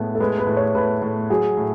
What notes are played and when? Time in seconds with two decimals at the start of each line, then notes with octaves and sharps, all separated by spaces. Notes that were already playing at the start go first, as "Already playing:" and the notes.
Already playing: A2 G#3 B3
0.15 A4
0.20 G#3 B4
0.38 B4
0.47 A2
0.57 C#5
0.75 A2 B4
1.02 A2
1.30 F#3 G#4
1.57 A2